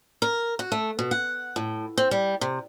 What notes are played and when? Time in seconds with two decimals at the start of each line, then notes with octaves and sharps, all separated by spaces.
0.22 A#4
0.59 F#4
0.72 A3
0.99 B2
1.11 F#5
1.56 A2
1.98 C4
2.11 G3
2.41 C3